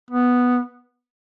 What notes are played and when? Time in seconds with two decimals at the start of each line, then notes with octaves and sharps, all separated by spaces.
0.10 B3